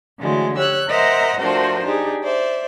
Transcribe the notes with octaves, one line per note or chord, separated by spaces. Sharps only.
D3 E3 F#3 G#3 A3
G4 C#5 E6 F#6
A#4 C5 D#5 E5 F#5 A#5
F3 A3 D4 F#4 A#4 C5
D4 D#4 G4 G#4
C5 D5 E5